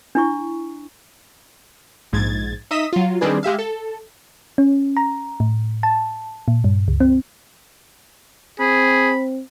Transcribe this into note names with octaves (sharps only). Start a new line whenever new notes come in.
D4 E4 C#6
A#1 G#2 G#6 A6
D#4 D#5 E5 D#6 B6 E7
F#3 F4
D#3 G3 C4 D4 G#4 B4
G#3 G4 E5 F5
A4
C#4
A#5
A2
A5
A#2
G2
C#2
C4
C4 G#4 B5